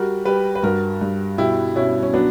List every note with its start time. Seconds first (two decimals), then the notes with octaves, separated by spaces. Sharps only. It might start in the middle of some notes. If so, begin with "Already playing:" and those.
Already playing: G3 F#4 A#4
0.25 G3 G4 B4
0.55 B4
0.63 G2 F#4 A#4
1.01 G2
1.38 B2 E4 G4
1.76 B2 C#4 E4
2.03 C#4
2.14 F#3 B3 D4